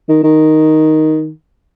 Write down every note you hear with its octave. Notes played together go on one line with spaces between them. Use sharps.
D#3
D#3